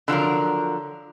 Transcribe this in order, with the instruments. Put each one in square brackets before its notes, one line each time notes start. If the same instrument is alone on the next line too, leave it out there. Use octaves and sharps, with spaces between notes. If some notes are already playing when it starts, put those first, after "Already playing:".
[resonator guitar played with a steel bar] D3 F3 F#3 A#4